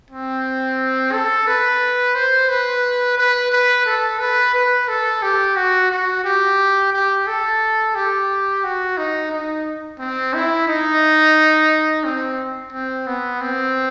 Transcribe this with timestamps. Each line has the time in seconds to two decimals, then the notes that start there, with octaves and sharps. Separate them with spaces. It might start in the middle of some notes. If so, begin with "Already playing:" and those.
0.11 C4
1.13 A4
1.47 B4
2.15 C5
2.49 B4
3.18 B4
3.52 B4
3.86 A4
4.20 B4
4.54 B4
4.89 A4
5.23 G4
5.56 F#4
5.91 F#4
6.25 G4
6.93 G4
7.27 A4
7.95 G4
8.64 F#4
8.97 D#4
9.32 D#4
9.99 C4
10.34 E4
10.68 D#4
12.05 C4
12.72 C4
13.07 B3
13.41 C4